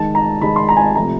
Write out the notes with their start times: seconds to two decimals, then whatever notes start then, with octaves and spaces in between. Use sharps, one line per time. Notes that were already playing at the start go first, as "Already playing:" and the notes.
Already playing: D#3 G#3 A5
0.15 A#5
0.41 D#3 G#3 B5
0.56 C6
0.69 A#5
0.77 G#5
0.82 A5
0.96 C3 F3 A3 A#5